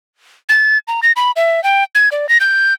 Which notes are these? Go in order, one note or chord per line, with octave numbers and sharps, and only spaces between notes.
A6
A#5
A#6
B5
E5
G5
G#6
D5
A#6
G6